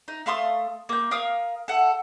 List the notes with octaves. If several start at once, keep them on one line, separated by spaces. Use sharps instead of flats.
D#4
A3 F5 C6 D#6
A#3 G6
A#4 F5 D#6
A4 F#5